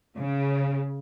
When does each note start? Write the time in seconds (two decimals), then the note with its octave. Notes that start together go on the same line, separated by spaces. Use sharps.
0.17 C#3